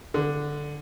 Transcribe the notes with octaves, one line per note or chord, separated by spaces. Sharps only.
D3